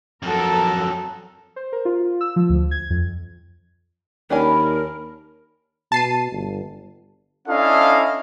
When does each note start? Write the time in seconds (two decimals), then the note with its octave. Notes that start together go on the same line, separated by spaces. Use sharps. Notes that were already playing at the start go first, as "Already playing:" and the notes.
0.22 F2 F#3 A4 A#4
1.56 C5
1.73 A#4
1.85 F4
2.21 E6
2.36 F3
2.50 D2
2.71 G#6
2.90 F2
4.30 D#2 C#4 D4 A#4 G#5 B5
5.92 B2 A5 C7 D#7
6.32 G1
7.48 C#4 D4 E4 A4 D#5 F5